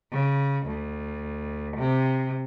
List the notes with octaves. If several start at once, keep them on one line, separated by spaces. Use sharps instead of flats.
C#3
D2
C3